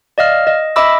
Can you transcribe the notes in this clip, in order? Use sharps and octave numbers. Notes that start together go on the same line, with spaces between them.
D5 D#5 F5 F6
D#5
D#5 E5 B5 D6 E6